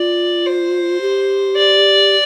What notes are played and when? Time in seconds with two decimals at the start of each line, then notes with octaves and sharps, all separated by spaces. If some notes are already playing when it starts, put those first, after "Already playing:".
Already playing: F4 D5
0.47 C5
1.01 G4
1.56 D5